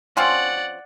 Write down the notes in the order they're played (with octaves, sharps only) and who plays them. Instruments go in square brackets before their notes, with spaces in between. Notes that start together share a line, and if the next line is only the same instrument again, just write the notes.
[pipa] F3 C4 C#4 [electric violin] D5 F#5